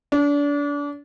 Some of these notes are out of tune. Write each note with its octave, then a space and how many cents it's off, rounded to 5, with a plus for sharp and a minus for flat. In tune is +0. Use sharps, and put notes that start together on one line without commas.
D4 -30